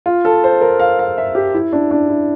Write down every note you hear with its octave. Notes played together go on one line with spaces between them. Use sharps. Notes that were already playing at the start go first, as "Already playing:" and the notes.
F4
A4
C5
A#4
F5
F5
E5
G4
E4
D4
D4
E4